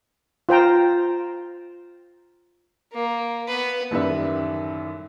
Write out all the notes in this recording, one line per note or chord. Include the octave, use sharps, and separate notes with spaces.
F4 C5 G5 A#5
A#3
B3 B4
A1 F#2 D#3 G3 B4 E5